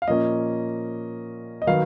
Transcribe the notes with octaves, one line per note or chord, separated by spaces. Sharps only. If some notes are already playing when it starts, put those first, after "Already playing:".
F5
A#2 F3 A#3 C#4 D#5
D#5
D#3 F#3 B3 F5